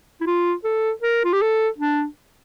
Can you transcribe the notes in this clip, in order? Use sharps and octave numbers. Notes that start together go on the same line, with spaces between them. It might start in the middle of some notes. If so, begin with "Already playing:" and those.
E4
F4
A4
A#4
F4
G4
A4
D4